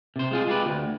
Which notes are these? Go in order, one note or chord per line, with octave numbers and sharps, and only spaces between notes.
C3 C5
G#3 F4 G#4
G#3 F4 G4 B4
D2